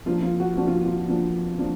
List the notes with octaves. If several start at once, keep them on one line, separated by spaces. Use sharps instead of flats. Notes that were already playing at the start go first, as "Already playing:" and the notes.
F3 A#3 D4 F4
F4
F#4
F3 A#3 D4 F#4
F4
F4
F3 A#3 D4
F3 A#3 D4